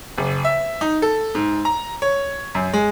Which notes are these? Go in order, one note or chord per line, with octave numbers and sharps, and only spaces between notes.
F#1
E5
D#4
A4
G#2
A#5
C#5
F#2
G#3